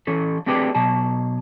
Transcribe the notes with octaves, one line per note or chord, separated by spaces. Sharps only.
E3 C#4 A4
A3 C4 D4 G4 G#4 B4
B2 F#3 A5